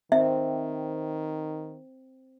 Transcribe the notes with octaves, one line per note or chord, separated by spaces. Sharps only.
D#3 C4 E5